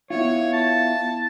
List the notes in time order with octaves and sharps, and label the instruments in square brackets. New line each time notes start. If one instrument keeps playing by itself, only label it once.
[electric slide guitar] B3 E4 F4 [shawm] C#5
[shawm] A5